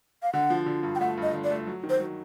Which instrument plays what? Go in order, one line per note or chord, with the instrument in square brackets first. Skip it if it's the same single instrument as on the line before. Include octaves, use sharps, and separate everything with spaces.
[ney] F5
[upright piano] D3 [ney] F#5
[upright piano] F3
D3
G2
[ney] G5
[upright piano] A3 [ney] F#5
[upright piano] G2
[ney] D#5
[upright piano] D3
[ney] D5
[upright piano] A3
F#3
D#3
[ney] C5
[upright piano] F#3